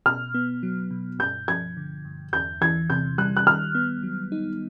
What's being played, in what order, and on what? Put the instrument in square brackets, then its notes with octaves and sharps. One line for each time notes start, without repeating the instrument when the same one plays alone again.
[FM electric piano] B2 [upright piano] F6
[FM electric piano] B3
F#3
B2
[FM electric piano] G2 [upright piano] G6
[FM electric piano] F3 [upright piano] G#6
[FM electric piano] D3
G2
[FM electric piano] E2 [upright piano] G6
[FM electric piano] E3 [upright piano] G#6
[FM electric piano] C3 [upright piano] G6
[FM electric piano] G3 [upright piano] F#6
[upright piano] F#6
[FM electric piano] D#3 [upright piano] F6
[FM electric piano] B3
F#3
D#4